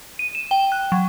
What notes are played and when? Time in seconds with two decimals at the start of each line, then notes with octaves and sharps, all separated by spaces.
0.19 D#7
0.35 E7
0.51 G5
0.72 F#6
0.92 F#3